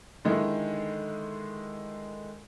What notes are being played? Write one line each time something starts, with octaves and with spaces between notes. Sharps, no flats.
D3 D#3 G#3 D#4 E4